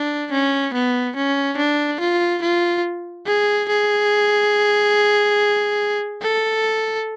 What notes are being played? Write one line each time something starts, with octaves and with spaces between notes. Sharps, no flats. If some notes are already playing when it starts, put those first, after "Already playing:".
Already playing: D4
C#4
B3
C#4
D4
F4
F4
G#4
G#4
A4